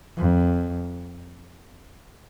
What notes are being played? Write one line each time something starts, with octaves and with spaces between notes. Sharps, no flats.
F2